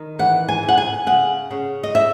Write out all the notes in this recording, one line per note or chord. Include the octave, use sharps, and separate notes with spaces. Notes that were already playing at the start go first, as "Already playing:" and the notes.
Already playing: D#3
E3 F#5
G#5
C#3
F#5
G#5
C#3 F#5
C#3
D#5
E5